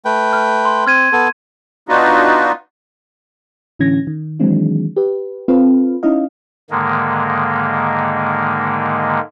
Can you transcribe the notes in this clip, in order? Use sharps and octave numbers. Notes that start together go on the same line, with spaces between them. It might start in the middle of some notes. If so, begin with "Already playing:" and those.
A3 B4 G5
F6
C6
C4 F6 G#6 D#7
B3 A4
B3 D4 D#4 F4 F#4 B4
A2 D3 E3 C#4 G#6 A#6
D#3
D#3 E3 F#3 G#3 C4 D4
G4 B4
C4 F4 A4 B4 F5
C#4 D#4 E4 D#5 F5
G#2 D3 D#3 G#3 A#3